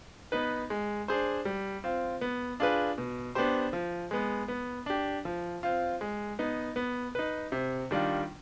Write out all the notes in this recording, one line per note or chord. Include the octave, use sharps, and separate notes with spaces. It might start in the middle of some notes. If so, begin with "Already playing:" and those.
B3 D#4 B4
G#3
D4 G#4 C5
G3
C4 F4
B3
D4 F4 G#4 B4
B2
B3 D4 G4 C5
F3
G#3 B3
B3
D4 G4
F3
C4 F4
G#3
B3 D#4
B3
D#4 B4
C3
D#3 G3 D4 F4